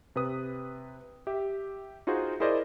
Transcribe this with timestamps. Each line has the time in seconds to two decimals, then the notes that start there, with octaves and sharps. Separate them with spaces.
0.16 C3 B4 D#6
1.27 G4 E5
2.07 D#4 F4 F#4 G#4 C5
2.40 E4 G#4 A#4 C5 D5 D#5